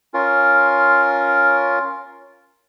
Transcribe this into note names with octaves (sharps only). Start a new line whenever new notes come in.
C#4 F4 A#4